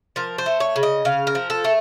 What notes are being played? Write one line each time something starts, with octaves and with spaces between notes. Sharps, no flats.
F3 A#4
C5
A3
C#5
C#3
D#5
C#3 F5
A#4
F3
A4
A3